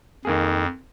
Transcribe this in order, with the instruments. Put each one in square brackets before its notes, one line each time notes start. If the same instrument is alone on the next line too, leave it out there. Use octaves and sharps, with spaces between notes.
[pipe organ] F2 [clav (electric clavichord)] D#3 A#3 G#4